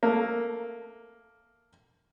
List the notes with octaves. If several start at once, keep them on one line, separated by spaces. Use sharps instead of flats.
A3 A#3